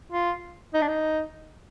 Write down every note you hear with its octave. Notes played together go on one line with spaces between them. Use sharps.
F4
D#4
D4
D#4